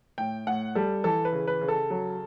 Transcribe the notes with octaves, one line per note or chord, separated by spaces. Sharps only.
A2 G5
A2 F#5
G3 A4
E3 A4
B4
C#3
B4
C#3
A4
F#3